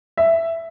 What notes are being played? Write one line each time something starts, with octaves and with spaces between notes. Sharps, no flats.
E5